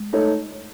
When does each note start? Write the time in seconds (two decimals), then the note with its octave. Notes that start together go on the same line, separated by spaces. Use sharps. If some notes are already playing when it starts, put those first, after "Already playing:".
Already playing: G#3
0.13 A3 D#4 A4 C#5